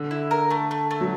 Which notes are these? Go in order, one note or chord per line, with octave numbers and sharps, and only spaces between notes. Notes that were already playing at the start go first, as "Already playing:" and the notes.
Already playing: D3
E4
A#4
A3
A3
A3
F#3